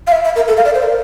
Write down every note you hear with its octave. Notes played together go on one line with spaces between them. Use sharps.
F5
E5
E5
A#4
A4
F5
D5
C5
A#4